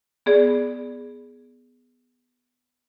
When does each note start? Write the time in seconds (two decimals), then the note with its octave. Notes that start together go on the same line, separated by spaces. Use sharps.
0.26 B3 G#4 D5